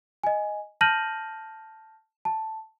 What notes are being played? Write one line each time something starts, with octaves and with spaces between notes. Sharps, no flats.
D#5 G#5
A5 F6 G6 A#6 D#7 F#7
A5